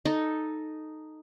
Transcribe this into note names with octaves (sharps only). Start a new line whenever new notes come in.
D#4 A4